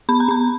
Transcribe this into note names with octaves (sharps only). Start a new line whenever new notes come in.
B3 B5
A#5
B3 B5